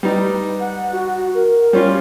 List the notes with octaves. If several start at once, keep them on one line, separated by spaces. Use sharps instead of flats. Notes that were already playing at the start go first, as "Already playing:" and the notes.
G3 D#4 B4
F#5
F#4
A#4
G3 C#4 F4